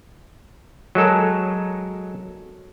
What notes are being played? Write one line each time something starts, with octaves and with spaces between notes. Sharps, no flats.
F#3 G#3 A4 A#4